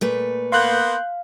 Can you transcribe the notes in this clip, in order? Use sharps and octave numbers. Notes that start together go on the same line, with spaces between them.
A#2 A3 B4
A#3 B3 F5 C6 F#6 G6